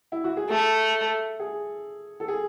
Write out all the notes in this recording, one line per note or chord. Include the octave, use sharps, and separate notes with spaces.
E4
F#4
G#4
A3 A4
G#4
A4
G#4